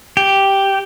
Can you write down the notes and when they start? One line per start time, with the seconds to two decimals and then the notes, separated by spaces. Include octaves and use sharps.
0.17 G4